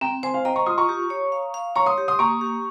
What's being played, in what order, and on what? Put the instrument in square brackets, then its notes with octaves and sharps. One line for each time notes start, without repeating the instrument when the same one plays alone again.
[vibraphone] C4 [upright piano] G5 A#5
[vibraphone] C5 [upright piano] G#5 C6
[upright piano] F5 G#5
[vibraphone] D#5 [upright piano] G5 A#5
[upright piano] A#5 C#6
[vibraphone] F4 [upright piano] C6 D#6
[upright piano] A#5 C#6
[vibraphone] G4
C#5
F5
F5
[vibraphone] C#5 [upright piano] A#5 C#6
[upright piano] C6 D#6
[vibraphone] G4
[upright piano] C6 D#6
[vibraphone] A#3 [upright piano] A#5 C#6
[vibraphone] G4